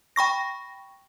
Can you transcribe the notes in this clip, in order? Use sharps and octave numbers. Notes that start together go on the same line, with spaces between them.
G5 B5 C#6 A#6